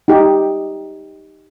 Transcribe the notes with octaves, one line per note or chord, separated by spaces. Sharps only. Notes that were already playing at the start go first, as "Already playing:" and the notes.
D#4 G4